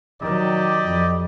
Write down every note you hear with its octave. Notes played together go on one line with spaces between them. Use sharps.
D#3 F#3 G4 D5 D#5
F2